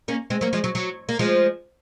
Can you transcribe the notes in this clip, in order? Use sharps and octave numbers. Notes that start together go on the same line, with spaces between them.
A#3 C#4
G#3 C4
F#3 A#3
F3 G#3
F#3
F#3
A#3
F3 G#3